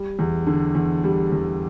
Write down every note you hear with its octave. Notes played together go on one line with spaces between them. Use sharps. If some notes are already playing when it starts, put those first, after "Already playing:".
Already playing: G3
E2
D3
E2
G3
E2